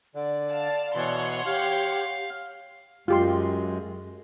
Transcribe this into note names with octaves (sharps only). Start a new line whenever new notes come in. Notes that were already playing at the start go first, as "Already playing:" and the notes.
D3 D5
F5 A5
B2 E3 C#5 F#5 C6
G4 F5
F#2 G#3 F4 G4 C6